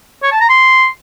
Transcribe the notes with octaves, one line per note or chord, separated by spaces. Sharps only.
C#5
A5
A#5
C6